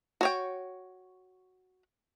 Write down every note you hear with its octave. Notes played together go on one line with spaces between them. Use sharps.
F#4 C#5 G5